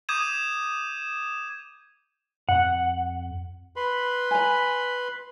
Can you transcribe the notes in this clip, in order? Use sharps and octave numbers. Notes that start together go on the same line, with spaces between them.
D6 D#6 G6 G#6 D#7 E7
F2 F#5
B4 B5 C6
G#5 A#5